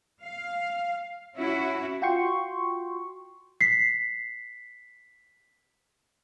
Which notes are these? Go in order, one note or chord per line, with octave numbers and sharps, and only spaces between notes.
F5
C#4 E4 F#4
F4 F#4 G5 C6 C#6
B6 C7